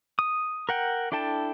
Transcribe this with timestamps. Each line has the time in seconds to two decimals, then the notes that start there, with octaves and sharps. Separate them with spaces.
0.19 D#6
0.69 A#4 F#5 G5
1.12 D4 E4 A4 G5 A5